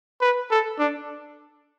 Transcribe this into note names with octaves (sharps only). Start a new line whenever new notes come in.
B4
A4
D4